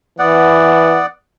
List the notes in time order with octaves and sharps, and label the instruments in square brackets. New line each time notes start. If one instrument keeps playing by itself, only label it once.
[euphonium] E3 [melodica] B3 D5 F#5